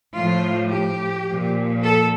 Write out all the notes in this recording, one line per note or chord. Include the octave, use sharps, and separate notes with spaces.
A2 F3 F4
G4
A#2 F3
A4